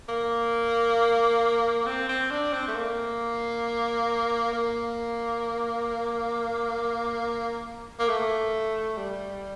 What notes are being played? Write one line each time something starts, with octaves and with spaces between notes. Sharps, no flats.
A#3
C4
C4
D4
C4
A3
A#3
A#3
A#3
A3
G3